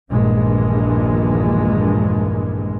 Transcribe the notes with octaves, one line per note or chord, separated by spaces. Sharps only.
A#1 E2 G2 A#2 D#3 G#3